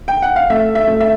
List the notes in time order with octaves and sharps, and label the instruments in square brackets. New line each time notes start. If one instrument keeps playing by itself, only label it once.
[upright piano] G5
F#5
F5
[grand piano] A3 [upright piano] E5
[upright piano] E5
[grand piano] A3
[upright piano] E5